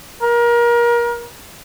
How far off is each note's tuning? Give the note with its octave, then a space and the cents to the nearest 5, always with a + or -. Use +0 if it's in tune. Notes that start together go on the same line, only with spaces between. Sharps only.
A#4 +30